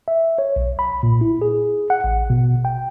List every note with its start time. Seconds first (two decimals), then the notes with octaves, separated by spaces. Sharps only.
0.08 E5
0.38 C#5
0.56 B1
0.79 B5
1.03 A#2
1.21 E4
1.42 G#4
1.90 F#5
2.04 A1
2.30 B2
2.65 G5